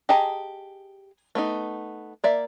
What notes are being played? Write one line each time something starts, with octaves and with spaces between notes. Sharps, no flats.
G4 G#4 D#5 A5 A#5
A3 B3 D#4
A#3 D5 E5